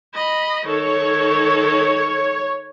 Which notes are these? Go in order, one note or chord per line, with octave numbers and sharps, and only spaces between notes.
D#5 B5
D#3 A4 C#5